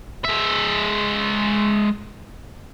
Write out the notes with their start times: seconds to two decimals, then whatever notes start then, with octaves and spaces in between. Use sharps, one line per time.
0.25 G#3 E5